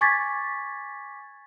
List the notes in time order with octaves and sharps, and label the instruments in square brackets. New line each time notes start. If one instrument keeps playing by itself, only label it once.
[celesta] G#5 C#6 D6 G#6 A6 B6